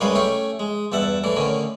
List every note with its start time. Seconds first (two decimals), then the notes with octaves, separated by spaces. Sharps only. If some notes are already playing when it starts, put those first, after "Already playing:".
0.01 F#2 G3 G#3 B4 C#5 F5
0.15 A3 C#4 G4 C#5 C#6
0.60 G#3
0.92 E2 G2 E5 F#5 A5
1.24 A2 E3 D4
1.36 A2 D3 D#3 C#4